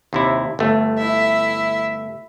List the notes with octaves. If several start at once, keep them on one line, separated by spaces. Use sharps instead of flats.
D#2 C3 E4
G1 A3
E4 E5